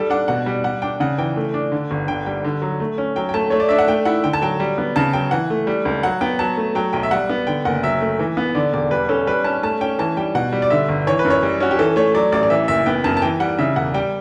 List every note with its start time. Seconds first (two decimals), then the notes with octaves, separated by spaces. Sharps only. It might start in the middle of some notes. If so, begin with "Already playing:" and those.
Already playing: G3 A4
0.10 D4 F#5
0.28 B2 F#5
0.46 G3
0.64 G3 F#5
0.82 D4 G5
1.00 C#3 F#5
1.18 E3 G5
1.37 A3
1.54 D4
1.72 D3
1.91 G1
2.08 D3 G5
2.26 G3 G5
2.44 D3
2.62 F#3
2.80 A3
2.98 C#4
3.16 F#3 G5
3.29 G5
3.34 A3 A5
3.50 A3 C#5
3.60 D5
3.69 D4 E5
3.79 F#5
3.88 A3 G5
4.05 E4 F#5
4.24 D3 G5
4.33 A5
4.42 F#3 G5
4.60 G3
4.78 B3
4.96 C#3 A5
5.13 F#3 G5
5.31 E3 F#5
5.50 A3
5.67 G3
5.85 C#2
6.03 F#3 F#5
6.21 B3 G5
6.39 F#3 A5
6.57 A3
6.75 F#3 G5
6.93 B1 G5
7.03 E5
7.11 G3 F#5
7.30 B3
7.47 D3 G5
7.65 F#1 F#5
7.83 F#3 E5
8.01 A3
8.19 E3
8.37 B3
8.55 D3 D5
8.73 E1 D5
8.91 G3 B4
9.09 C#4 A4
9.27 G3 B4
9.44 C#4 A5
9.63 A3 A5
9.81 C#4 G5
9.99 E3 A5
10.17 G3 G5
10.35 B2 F#5
10.52 G3
10.62 D5
10.70 D3 E5
10.89 G1
11.07 E3 C#5
11.19 B4
11.25 F#2
11.30 C#5
11.43 G3
11.60 C#4 F#4
11.71 G4
11.79 E3 A4
11.96 A3 C#5
12.15 F#3 D5
12.32 A1 D5
12.43 D5
12.50 E3 E5
12.68 F#1 E5
12.86 B3 G5
13.04 F#2 A5
13.17 A5
13.22 E3 G5
13.40 G3 F#5
13.59 C#3 E5
13.76 E1 F#5
13.94 G3 G5